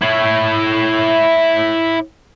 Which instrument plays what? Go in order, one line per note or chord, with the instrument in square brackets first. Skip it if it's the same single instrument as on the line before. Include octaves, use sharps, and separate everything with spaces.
[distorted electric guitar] E4 C#5